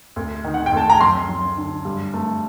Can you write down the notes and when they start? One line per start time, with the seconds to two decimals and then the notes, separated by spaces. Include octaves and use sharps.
0.16 D2
0.44 D#3
0.54 F#5
0.66 G5
0.73 D2 A5
0.90 A#5
1.01 F#2 C6
1.29 F#2
1.57 D3
1.85 G2
2.14 A3